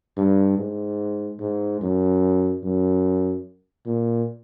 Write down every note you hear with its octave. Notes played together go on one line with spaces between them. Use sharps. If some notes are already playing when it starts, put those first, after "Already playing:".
G2
G#2
G#2
F#2
F#2
A#2